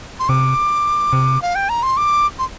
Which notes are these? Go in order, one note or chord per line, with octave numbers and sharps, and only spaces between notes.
C6
C3 D6
C3
F5
G5
A#5
C6
D6
C6